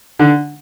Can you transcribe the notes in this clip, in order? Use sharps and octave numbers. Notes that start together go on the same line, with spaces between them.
D3